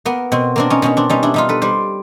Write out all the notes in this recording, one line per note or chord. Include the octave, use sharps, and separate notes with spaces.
A#3 B3
B2 C4
A#3 C4 D4
C#4 D#4
B2 C#4 D#4
C4 D4
G3 C#4 D#4
D4 E4
G3 D#4 F4
A4 B4
G3 C5 D5